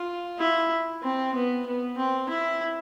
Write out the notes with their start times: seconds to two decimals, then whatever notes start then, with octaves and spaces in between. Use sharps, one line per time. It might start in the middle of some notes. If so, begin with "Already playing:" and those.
Already playing: F4
0.39 E4
1.03 C4
1.34 B3
1.66 B3
1.97 C4
2.29 E4